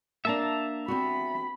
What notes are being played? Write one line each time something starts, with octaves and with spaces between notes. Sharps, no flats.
A#3 D4 E5 A5 A#5
B3 C4 F#4 B5